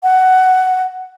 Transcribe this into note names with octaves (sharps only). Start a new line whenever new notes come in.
F#5